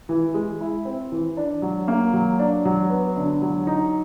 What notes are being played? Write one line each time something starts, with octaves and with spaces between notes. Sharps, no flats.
E3
G#3
E4
C4
E3
D4
F#3
A#3
F#3
D4
F#3
B3
D3
F#3
D#4